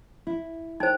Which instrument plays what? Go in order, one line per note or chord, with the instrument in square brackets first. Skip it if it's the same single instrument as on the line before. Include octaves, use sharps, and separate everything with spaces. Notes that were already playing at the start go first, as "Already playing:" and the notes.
[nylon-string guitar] E4
[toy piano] D#4 C5 [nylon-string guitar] G5